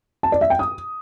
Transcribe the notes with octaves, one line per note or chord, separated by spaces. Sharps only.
A5
D5
E5
G5
D#6